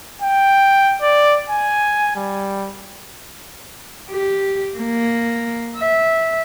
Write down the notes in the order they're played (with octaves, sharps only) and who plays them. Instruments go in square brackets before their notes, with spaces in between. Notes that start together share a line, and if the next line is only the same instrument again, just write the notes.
[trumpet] G5
D5
G#5
G3
[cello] G4
A#3
E5